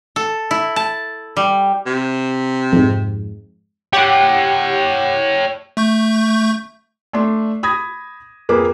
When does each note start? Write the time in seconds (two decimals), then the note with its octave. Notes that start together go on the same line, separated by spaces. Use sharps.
0.16 A4
0.51 E4
0.76 A5
1.37 G3
1.86 C3
2.72 F2 G#2
3.93 G4 C#5 F#5 G5
5.77 A3 C#6 G6
7.13 A3 D4 D5 C6
7.63 B5 D#6 G#6 A#6
8.49 F2 A#3 G#4 B4 D6